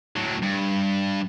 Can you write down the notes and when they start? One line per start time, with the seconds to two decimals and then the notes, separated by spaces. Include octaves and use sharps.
0.16 A2 F#3
0.43 G2